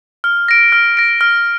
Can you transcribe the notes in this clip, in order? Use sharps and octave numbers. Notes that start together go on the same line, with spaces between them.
F6
A#6 D7
F6
A#6 D7
F6